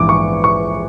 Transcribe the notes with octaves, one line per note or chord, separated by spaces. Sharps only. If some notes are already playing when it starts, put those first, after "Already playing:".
Already playing: A#1 G#2 E3 D6
C#6
C#6